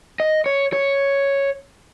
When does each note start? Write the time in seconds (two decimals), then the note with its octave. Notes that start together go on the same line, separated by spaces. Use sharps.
0.20 D#5
0.46 C#5
0.73 C#5